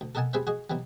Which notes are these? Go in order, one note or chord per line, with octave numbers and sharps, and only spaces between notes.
D2
A4 A#4 D#5 F#5 G#5 A5
G3 C4 G#4 B4 C5 E5
F#4 G#4 D#5
B2 E3 F#3 G3